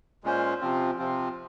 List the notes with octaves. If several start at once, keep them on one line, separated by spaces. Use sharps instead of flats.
A#2 G#3 C#4 F4 C5
C3 F3 C4 F4
C3 F3 C4 F4